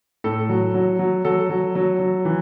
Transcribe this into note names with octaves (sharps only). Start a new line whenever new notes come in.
A2 A4
F#3
F#3
F#3
F#3 A4
F#3
F#3
F#3
E3